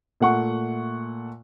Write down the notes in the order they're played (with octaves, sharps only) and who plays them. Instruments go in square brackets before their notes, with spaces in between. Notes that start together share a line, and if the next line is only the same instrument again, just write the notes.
[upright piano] A#2 A3 F#5 C#6